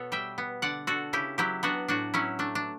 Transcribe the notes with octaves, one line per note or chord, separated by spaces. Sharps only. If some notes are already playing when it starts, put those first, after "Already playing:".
Already playing: B2 B3 A4 C#5
G3 E5 G5
B3
D3 D5 F#5
D3 F#4 A4
C#3 E4 G4
F#3 E4 G4
B3 D4 F#4
A2 D4 F#4
F#3 C#4 E4
A3 D4
D4